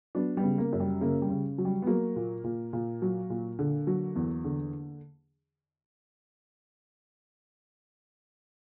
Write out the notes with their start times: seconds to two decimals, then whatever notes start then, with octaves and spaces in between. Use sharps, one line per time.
0.15 F#3 B3 D4
0.37 G3 B3
0.43 C#3
0.58 A#3
0.73 F#2
0.80 G3
1.01 C#3 A#3
1.22 G3
1.29 C#3
1.58 F#3
1.65 G3
1.82 B3
1.87 F#3 A#3
2.16 A#2
2.44 A#2
2.73 A#2
3.02 F#3
3.30 A#2
3.59 D3
3.87 F#3
4.16 E2
4.44 D3